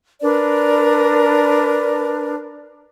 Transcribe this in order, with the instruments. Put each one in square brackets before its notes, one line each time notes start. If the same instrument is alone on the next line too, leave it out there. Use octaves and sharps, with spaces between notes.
[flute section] D4 A#4 B4 D5